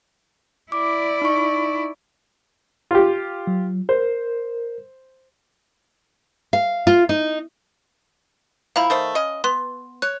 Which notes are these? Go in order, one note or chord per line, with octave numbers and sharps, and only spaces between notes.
E4 D5 D6
D#4 C#6
F4 G4
F#3
A#4 C5
F5
F4
D#4
F3 E4 F5 A#5 B5
D#3 A3 C5
C#4 D#5
B3 C6
C#5 F#6